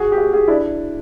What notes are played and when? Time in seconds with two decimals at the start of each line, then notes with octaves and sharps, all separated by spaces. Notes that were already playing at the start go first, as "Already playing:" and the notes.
Already playing: F#4 G#4
0.12 G4
0.18 F#4 G#4
0.33 F#4 G#4
0.48 D4 E4